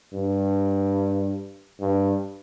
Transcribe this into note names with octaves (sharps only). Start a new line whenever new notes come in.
G2
G2